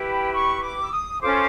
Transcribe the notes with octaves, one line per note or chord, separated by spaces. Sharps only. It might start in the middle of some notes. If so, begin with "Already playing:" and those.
Already playing: E4 G4 B4
G5
C#6
D6
E6
D#6
C#4 F4 A4 C5 D6